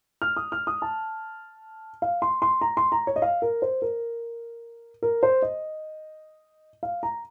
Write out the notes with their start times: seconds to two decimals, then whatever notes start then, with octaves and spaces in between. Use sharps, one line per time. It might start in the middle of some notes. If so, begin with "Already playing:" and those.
0.22 F6
0.37 D#6
0.52 F6
0.67 D#6
0.82 A5
2.02 F5
2.22 C6
2.42 C6
2.61 A#5
2.77 C6
2.92 A#5
3.07 C#5
3.16 D#5
3.22 F5
3.42 A#4
3.62 C5
3.82 A#4
5.03 A#4
5.23 C5
5.42 D#5
6.83 F5
7.03 A#5